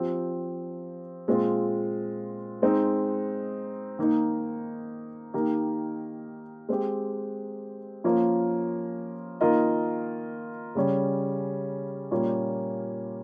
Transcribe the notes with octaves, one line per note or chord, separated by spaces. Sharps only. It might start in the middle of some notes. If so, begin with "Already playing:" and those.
Already playing: F3 C4 G4
A#2 G#3 C4 F4
G#3 C4 D#4
D#3 A#3 D#4
D#3 A#3 D#4 G4 A#4
G#3 C4 G4
F3 A#3 C#4 F4 A#4
D#3 A#3 F4 A#4 D#5
C#3 G3 C#4
A#2 G3 A#3 C#4 F4